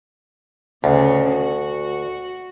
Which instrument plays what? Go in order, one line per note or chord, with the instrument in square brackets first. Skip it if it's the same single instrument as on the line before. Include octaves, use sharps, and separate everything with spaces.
[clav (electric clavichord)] D2 [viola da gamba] C#3
[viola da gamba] F#4